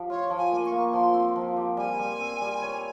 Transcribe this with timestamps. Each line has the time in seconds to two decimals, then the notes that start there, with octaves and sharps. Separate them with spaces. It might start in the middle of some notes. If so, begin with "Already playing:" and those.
Already playing: F3 G4
0.10 F4 C#5
0.30 F3
0.37 G#5
0.52 A#3
0.66 C#6
0.72 A#3
0.93 F3 C6
1.14 C4
1.36 F3
1.56 G4
1.77 G3 G#5
1.99 G3
2.20 C4
2.41 G3
2.62 C#5